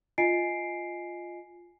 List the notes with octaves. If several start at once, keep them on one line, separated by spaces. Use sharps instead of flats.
F4 D#5 G#5 C7 D7